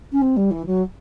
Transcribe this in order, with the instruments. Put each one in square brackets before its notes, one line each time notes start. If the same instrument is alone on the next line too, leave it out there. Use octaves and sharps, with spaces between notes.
[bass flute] C#4
C4
G3
E3
F#3